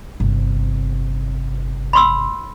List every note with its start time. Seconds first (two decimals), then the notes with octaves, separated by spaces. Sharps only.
0.20 G1 C3
1.93 B5 C6 E6